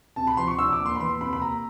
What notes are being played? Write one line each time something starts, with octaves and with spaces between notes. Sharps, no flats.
C3 A5
B5
F3 C6
C#6
D4 E6
D6
A#3
C6
B5
E2 C6
C3 B5
B5
A#3 A#5